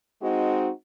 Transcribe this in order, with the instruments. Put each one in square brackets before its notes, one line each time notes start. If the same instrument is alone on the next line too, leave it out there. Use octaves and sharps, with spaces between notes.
[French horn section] G#3 C4 D#4 F#4